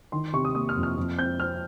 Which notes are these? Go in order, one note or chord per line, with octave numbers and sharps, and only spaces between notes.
D#3 C6
C3 C#6
D#6
A#3 D#6
F6
F2
F6
F2
C4 G6
C4 F6